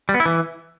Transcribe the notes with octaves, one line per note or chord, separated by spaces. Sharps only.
G3
B3
E4
E3